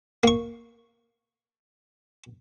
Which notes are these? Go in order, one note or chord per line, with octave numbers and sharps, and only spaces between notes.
A#3 C#6